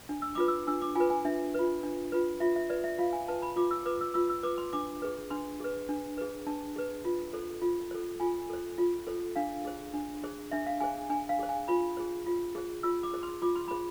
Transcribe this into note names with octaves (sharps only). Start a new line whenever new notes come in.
D4
E6
F4 B4 D6
E6
D4 E6
D6
F4 B4 G#5
G#5
D4 E5
F4 B4
D4
F4 B4
F4 E5
E5
B4 D5
E5
F4 F5
G#5
B4 A5
B5
F4 D6
E6
B4 D6
E6
F4 E6
E6
B4 D6
C6
D4 D6
G#4 B4
D4 C6
G#4 B4
D4
G#4 B4
D4 A5
G#4 B4
F4
A4 C5
F4
A4 C5
F4 G#5
A4 C5
F4
A4 C5
D4 F5
G#4 C5
D4
G#4 C5
D4 E5
F5
G#4 C5 G#5
D4 G#5
F5
G#4 C5
G#5
F4 B5
G#4 C5
F4
G#4 C5
F4 E6
D6
G#4 C5
C6
F4 D6
C6
G#4 C5 B5